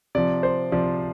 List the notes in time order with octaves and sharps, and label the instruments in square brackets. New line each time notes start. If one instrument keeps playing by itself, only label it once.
[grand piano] C3 F3 D5
C5
C3 F3 D5